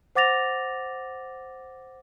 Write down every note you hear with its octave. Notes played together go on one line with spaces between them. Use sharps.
C5 F#5 D6 A6 A#6 F7